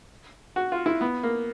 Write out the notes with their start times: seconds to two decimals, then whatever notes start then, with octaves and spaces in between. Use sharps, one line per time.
0.56 F#4
0.72 F4
0.86 E4
1.01 B3
1.23 A#3